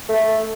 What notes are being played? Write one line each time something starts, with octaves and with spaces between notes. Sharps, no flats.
A3